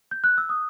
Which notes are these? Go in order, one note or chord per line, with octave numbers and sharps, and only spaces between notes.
G6
F#6
E6
D#6